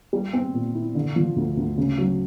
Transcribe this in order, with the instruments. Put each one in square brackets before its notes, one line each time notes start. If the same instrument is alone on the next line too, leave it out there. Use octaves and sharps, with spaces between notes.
[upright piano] G3
C4
A#2
E4
D3
F3
D2
D2
C#3
F#3